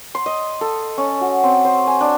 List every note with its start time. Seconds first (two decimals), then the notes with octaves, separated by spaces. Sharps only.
0.15 C6
0.26 D#5
0.61 A4
0.97 C#4
1.21 F#4
1.43 C4
1.65 C5
1.87 G#5
2.01 D4